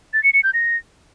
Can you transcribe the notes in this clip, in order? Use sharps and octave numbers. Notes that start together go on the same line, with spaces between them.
A6
C#7
C#7
G6
A#6